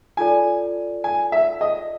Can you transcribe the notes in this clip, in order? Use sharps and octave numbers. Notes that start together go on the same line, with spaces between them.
F4 A4 D5 G#5
G#5
E5
D#5